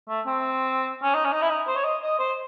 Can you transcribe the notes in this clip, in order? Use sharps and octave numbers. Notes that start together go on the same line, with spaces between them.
A3
C4
C#4
D#4
C#4
D#4
E4
D#4
C5
C#5
D#5
D#5
C5